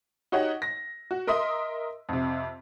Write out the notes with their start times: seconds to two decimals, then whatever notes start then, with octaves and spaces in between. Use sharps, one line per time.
0.32 D#4 F#4 G4 C#5 D#5 F#5
0.62 A#6
1.11 F#4
1.27 A#4 D#5 E5 C6 D#6
2.09 F2 C3